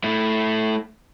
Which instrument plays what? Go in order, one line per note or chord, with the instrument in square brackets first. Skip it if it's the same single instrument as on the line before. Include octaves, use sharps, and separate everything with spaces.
[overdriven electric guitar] A3 E4